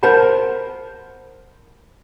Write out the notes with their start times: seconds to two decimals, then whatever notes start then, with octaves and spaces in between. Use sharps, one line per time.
0.03 A#4 C5 F#5 A5 B5